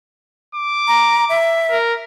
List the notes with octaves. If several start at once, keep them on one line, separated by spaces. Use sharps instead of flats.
D6
A#5
E5
A#4